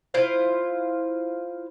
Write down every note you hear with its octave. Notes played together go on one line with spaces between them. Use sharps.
E4 F4 C5 F5